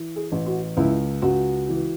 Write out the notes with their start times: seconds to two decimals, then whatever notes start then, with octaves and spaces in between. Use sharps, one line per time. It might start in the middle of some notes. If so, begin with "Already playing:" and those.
Already playing: E3
0.16 G#4
0.32 A1
0.46 F#4
0.77 C#2 E4
1.22 C#2 F#4
1.69 E3